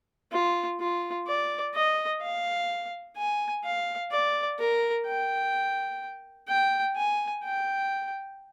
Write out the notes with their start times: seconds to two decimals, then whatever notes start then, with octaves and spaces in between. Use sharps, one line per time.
0.32 F4
0.80 F4
1.27 D5
1.74 D#5
2.22 F5
3.17 G#5
3.64 F5
4.12 D5
4.59 A#4
5.06 G5
6.48 G5
6.96 G#5
7.44 G5